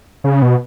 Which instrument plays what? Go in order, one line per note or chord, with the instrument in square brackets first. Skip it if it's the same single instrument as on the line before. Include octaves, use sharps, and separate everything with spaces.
[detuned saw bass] C#3
B2